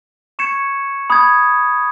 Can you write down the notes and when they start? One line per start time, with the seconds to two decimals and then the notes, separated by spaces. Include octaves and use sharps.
0.39 C#6 G#6 C#7 E7
1.10 B5 D#6 G#6